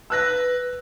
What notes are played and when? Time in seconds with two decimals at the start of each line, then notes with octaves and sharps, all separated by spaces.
0.10 B4 E6 F#6 A#6